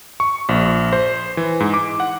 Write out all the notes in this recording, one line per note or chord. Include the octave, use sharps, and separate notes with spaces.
C#6
A#1
C5
E3
G#2
D6
F#5